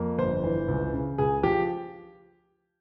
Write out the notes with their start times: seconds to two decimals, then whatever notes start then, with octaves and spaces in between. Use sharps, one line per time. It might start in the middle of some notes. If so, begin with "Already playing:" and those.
Already playing: F2 A#3
0.18 G1 C5
0.44 E3
0.68 C#2
0.93 C#3
1.18 C#2 G#4
1.43 F3 G4